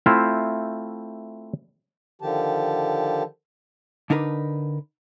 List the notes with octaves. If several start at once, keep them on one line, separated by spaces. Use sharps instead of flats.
A3 C4 E4 F4 C5 F5
D3 D#3 F3 G4 A5
D3 D4 D#4 A#4 B4